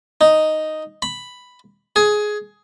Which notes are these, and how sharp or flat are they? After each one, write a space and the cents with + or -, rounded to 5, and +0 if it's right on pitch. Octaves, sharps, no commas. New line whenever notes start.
D#4 +0
B5 +5
G#4 +15